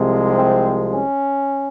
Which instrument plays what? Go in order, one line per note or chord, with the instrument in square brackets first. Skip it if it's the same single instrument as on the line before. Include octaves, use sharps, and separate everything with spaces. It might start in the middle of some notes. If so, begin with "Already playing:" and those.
Already playing: [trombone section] C2 C3 F3 G#3
C4
C#4